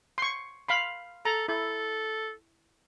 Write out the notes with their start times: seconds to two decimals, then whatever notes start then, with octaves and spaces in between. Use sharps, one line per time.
0.18 C6 C#6
0.68 F5 B5 C6
1.25 A4 A#5
1.48 E4 A4